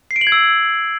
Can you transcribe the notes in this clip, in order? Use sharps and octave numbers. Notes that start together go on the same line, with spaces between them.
C7
D7
F#7
G#6
E6